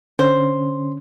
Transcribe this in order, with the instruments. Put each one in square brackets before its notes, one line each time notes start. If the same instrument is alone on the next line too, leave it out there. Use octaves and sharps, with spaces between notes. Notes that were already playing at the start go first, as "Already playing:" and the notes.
[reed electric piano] D3 C#4 [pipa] C5